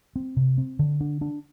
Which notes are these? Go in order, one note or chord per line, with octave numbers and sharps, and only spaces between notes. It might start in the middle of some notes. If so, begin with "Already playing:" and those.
C4
C3
C4
D3
D4
D4